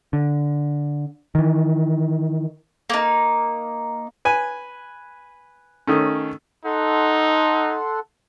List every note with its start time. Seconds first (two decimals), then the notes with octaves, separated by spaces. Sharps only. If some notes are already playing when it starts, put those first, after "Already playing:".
0.13 D3
1.35 D#3 E3
2.90 A#3 D#4
4.25 B4 G#5
5.87 D#3 A3 C#4
6.65 D#4 A4 F#5 C6